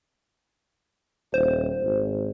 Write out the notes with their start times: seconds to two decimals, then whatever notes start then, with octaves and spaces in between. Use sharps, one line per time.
1.34 D#1 C5
1.83 G#1